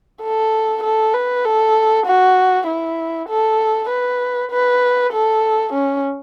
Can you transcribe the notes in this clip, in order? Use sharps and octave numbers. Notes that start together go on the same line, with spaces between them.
A4
A4
B4
A4
F#4
E4
A4
B4
B4
A4
C#4